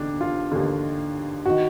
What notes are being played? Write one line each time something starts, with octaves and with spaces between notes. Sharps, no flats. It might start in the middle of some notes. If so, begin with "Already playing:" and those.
Already playing: D#2 D3 D4
F4
D#2 D3
D#3 F#4